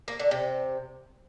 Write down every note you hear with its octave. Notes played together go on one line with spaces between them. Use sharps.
A#3
D3
C3